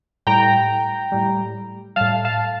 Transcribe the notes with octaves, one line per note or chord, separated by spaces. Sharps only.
A2 G3 G5 A#5
A2 G3
A2 G3 F5 A5
F5 A5